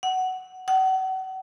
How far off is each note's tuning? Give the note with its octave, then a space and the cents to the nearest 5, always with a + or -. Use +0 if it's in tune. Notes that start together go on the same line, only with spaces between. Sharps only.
F#5 +10
F#5 +35